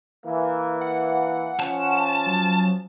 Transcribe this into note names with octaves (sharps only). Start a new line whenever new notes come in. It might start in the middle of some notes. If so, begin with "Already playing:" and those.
E3 A#3
F#5
F3 C#4 A5
F#3